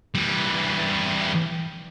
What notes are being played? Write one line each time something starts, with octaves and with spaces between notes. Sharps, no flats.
E3 G3